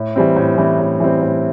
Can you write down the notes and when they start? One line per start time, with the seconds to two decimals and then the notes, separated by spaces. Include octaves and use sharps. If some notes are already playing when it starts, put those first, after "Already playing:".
Already playing: A2
0.16 E3 G3 C4
0.36 A2
0.58 E3 G3 C4
0.79 A2
1.00 E3 G3 C4
1.21 A2